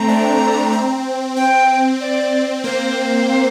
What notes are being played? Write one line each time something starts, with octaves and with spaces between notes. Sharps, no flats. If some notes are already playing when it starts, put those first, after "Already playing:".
Already playing: A3 C4 A#5
D4
C4
C4 G5
D5
A#3 C5